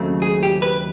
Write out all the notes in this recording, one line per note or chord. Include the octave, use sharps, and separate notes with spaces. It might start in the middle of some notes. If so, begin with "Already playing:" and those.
Already playing: D#2 C#3 F#3 A3 C4
G#4
G4
B4